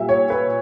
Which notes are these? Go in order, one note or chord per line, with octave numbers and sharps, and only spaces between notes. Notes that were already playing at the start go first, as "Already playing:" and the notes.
Already playing: A#2 G3 E5
C#5
B4